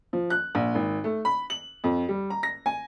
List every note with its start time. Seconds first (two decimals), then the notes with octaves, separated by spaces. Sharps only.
0.13 F3
0.30 F#6
0.55 A#1
0.75 G#1
1.04 A3
1.25 B5
1.50 F#7
1.84 F2
2.09 G3
2.30 A#5
2.43 A#6
2.66 G#5